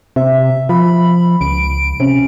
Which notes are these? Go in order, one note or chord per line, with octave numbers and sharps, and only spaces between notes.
C3 E5
F3 B5
C#2 D7
C3 C#4